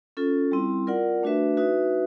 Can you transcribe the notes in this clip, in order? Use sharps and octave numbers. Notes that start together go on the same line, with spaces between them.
C#4 F4 A4
G3 C4 E4
F4 A#4 D5 F#5
A3 D4 F#4 B4 E5
D#4 F#4 B4 E5